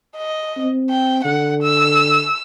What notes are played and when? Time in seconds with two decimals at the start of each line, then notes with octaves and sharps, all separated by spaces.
0.17 D#5
0.57 C4
0.90 G5
1.24 D3 F#5
1.63 E6